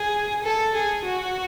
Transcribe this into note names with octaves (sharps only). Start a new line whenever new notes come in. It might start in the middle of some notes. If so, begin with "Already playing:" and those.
Already playing: G#4
A4
G#4
F#4